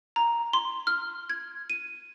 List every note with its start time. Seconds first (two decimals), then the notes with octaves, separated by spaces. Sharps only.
0.16 A#5
0.53 C6
0.87 F6
1.30 G#6
1.70 D#7